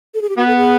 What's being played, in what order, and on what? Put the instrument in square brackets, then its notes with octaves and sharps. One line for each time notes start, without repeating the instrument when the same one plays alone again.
[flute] A4
G#4
G4
[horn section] B3 [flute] F#4
[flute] A4
G#4